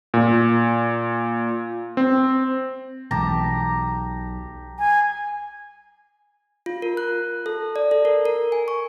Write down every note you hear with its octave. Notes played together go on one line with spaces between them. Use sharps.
A#2
C4
B1 B2 E3 G#3 G4 A5 A#5
G#5
F4
A#4
F#6
A4
D5
A4
A#4
A#4
G#5
C#6